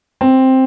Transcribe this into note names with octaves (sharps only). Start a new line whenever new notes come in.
C4